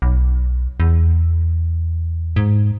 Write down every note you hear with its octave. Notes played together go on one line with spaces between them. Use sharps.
B1
E2
G#2